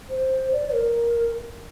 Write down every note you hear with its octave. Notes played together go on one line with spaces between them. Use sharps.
C5
D5
A#4